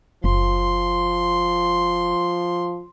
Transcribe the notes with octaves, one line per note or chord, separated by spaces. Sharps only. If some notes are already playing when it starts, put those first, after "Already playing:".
F#1 F3 C6